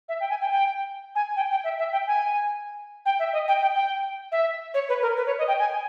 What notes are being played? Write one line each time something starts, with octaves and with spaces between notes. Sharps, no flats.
E5
G5
G#5
G5
G5
G#5
G5
G5
E5
E5
G5
G#5
G5
E5
D#5
G5
G5
G5
E5
C#5
B4
A#4
B4
C#5
D#5
G5
G#5